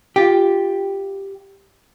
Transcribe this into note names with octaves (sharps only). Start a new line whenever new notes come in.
F4 G4